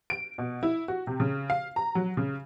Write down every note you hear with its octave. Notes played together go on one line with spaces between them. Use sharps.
D7
B2
E4
F#4
C3
C#3
F5
A#5
F#3
C#3